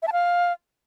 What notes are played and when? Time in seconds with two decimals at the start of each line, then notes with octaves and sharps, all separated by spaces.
0.02 E5
0.07 A5
0.13 F5